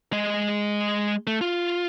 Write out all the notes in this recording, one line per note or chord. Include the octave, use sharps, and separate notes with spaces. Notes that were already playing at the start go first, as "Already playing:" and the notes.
G#3 D#5
A3
F4